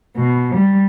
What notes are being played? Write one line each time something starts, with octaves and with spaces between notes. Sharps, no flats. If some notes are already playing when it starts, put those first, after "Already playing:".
B2
G3